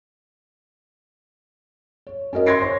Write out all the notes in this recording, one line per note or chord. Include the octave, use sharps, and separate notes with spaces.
C#5
C#4 F#4 A#4 D#5
C6 C#6 G#6 A#6 C7 D7
C5 C#5